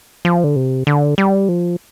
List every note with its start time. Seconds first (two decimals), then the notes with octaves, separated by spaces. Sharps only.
0.25 F3
0.44 D3
0.56 C3
0.87 D3
1.18 G3
1.49 F3